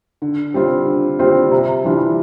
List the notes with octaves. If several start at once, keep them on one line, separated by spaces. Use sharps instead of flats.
D3
G3 C4 F4
D3
G3 C4 F4
C3
E3 G3 D4 F4